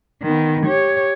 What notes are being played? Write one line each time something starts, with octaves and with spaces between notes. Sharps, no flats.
D#3 B3
G4 C#5